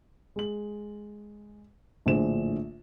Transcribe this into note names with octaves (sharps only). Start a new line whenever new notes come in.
G#3 F#7
A#1 A2 D3 G#4 C5 E7